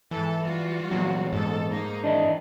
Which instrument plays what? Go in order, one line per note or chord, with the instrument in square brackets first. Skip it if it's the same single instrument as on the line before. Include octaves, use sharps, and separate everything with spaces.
[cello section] G#2 A4 [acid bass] E3
[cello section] G3 F4 F#4
[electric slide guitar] E2 A#2 [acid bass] F#3
[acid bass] G#2 [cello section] G#3 A4
[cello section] A#3 D#4
[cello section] D#3 E3 [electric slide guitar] D4 D#5 E5